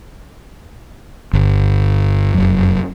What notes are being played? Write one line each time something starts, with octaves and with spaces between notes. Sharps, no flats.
G1
F1 F#2